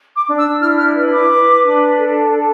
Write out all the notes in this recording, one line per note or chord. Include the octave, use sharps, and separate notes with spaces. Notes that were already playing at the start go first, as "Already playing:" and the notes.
D6
D4
E6
E4 F6
F6
B4
D6
B4
D4
A4
A4